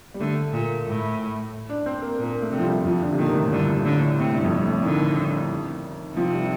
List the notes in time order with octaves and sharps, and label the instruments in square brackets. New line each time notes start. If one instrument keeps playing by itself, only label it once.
[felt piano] G3
[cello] D3 [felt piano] A3
[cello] A#2
A2
[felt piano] D4
C4
A#3
[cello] A#2 [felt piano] A#3
[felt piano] A3
[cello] C3
[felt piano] F3
G3
[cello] F2 [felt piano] F3
[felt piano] D3
C3
[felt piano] A#2 [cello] D#3
[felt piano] A2
[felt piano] G2 [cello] D3
[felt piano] G2
[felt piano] A2 [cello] D3
[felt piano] A2
[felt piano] A2 [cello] C3
[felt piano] G2
F2
G2
A2
[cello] D3 [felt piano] D#3
[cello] C3 [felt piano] F3
[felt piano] G3